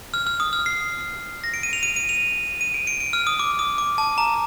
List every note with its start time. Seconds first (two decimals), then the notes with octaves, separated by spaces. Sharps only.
0.14 F6
0.27 F6
0.40 D#6
0.53 F6
0.66 C7
1.44 A#6
1.54 D7
1.63 D#7
1.73 F7
1.83 D#7
1.96 D#7
2.09 F7
2.61 D#7
2.74 D7
2.87 D7
3.00 D7
3.13 F6
3.27 D#6
3.39 D6
3.59 D#6
3.78 D6
3.98 A5
4.18 A#5